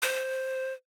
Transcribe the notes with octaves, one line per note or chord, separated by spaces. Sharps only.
C5